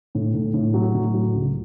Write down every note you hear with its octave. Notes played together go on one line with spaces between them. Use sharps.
A2
A2
A2
F#3
A2
F#3
C#2